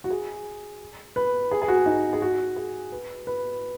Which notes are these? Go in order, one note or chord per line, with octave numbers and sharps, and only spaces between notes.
F#4
G#4
B4
G#4
G#4
F#4
D#4
G#4
F#4
G#4
B4
B4